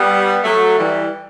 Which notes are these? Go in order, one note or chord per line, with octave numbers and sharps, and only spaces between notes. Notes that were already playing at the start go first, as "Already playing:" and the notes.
Already playing: G3 B3
F#3 A3
E3 G3